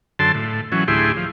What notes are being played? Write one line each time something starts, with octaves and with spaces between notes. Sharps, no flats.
F#2 D3 A4 A5 C6
A2
E3 F#3 C#4
D2 A2 E4 G4 G#4 C6
F3